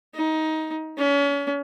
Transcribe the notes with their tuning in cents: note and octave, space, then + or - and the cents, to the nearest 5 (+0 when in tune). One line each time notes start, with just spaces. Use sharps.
D#4 +20
C#4 +35